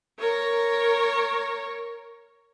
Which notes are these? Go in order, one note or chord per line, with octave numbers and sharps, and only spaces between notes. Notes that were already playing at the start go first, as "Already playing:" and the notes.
A#4 C#5